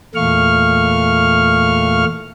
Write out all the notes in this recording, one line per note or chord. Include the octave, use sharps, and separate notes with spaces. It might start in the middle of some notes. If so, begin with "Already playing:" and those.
E2 A#2 A3 F5 C#6 F6